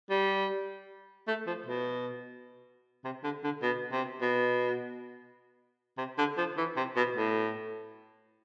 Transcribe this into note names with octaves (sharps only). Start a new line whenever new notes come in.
G3
A3
F3
B2
C3
D3
D3
B2
C3
B2
C3
D3
F3
E3
C3
B2
A2